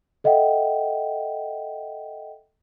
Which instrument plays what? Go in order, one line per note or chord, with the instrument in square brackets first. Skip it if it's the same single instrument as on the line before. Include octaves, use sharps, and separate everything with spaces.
[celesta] A4 D#5 E5 F#5 G5